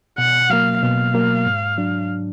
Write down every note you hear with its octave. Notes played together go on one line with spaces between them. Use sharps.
B2 F#5
F#3 A#3 F5
B2 F5
F#3 A#3
G#2
F#3 D4